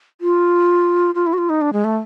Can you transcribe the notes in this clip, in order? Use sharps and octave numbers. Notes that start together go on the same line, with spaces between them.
F4
F4
E4
F#4
F4
D#4
D4
G#3
A3